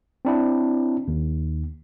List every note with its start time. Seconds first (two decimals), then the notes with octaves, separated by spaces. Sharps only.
0.25 C4 D4 E4
1.08 D#2